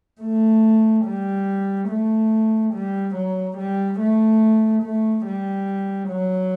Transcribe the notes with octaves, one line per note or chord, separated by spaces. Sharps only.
A3
G3
A3
G3
F#3
G3
A3
A3
G3
F#3